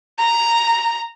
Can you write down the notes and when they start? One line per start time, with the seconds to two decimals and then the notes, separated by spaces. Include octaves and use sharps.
0.18 A#5